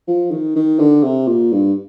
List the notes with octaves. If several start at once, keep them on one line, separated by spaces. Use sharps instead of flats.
F3
D#3
D#3
D3
C3
A#2
G2